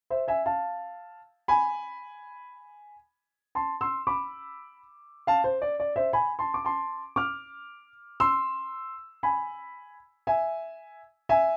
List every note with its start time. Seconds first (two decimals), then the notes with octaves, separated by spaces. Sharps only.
0.10 C5 E5
0.28 E5 G#5
0.46 F5 A5
1.48 G#5 B5
3.55 A5 C6
3.81 C6 E6
4.07 B5 D6
5.27 F5 A5
5.44 C5
5.62 D5
5.80 D5
5.96 C5 E5
6.13 G#5 B5
6.39 A5 C6
6.54 D6
6.65 A5 C6
7.16 D6 F6
8.20 C6 E6
9.23 G#5 B5
10.27 E5 G#5
11.29 E5 G#5